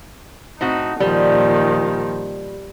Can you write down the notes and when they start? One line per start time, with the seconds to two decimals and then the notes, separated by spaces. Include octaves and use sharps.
0.61 A2 C4 D#4 F#4
1.00 A#2 D#3 F3 G3